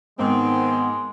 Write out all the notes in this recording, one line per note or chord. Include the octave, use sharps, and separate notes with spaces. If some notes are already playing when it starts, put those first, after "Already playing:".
G#2 D#3 G#3 B3 C4